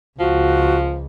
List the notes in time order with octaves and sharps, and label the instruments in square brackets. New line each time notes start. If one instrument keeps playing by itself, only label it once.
[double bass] C#2 [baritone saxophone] F3 [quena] F#4